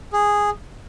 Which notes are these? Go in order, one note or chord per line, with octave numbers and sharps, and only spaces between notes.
G#4